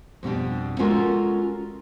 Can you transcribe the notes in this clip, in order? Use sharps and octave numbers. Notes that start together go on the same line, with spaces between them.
F2 B2 G3 D4
G#3 C#4 F4 F#4 A4 A#4